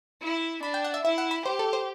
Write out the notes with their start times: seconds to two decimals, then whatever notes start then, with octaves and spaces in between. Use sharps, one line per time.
0.22 E4
0.63 D4 B5
0.74 G5
0.84 F#5
0.94 E5
1.05 E4 E5
1.18 F#5
1.31 B5
1.46 G4 C5
1.59 A4
1.73 C5